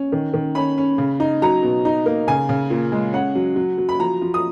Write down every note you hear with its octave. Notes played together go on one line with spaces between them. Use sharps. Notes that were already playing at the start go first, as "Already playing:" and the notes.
Already playing: C#4
D#3
D#3
C#4 B5
C#4
C#3
D#4
F#3 A#5
B2
D#4
A#3
C#3 G#5
C#3
A#2
G#3
C#4 F#5
F#3
F#3
F#3
B5
F3 A#5
F3
D#6